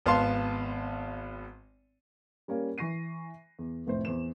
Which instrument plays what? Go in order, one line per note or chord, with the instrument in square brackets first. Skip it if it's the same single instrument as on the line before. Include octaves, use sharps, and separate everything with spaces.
[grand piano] G#1 B3 F5 A5 C6 C7
[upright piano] G3 A#3 C#4 F5
E3 C#6 A#6 C7 D#7
E2
F1 A2 C5
E2 C5 E7